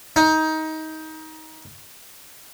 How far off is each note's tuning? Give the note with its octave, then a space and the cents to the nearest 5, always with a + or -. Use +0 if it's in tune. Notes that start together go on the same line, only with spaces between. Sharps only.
D#4 +20